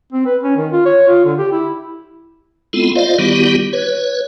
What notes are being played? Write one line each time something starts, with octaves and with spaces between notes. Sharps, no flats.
C4
B4
C#4
D#3
F4
C#5
F4
D3
G4
E4
G#3 B3 C4 E4 F4 A4
F4 C5 D5 D#5 F5
D#3 G3 B3 E4 F#4 G4
B4 C#5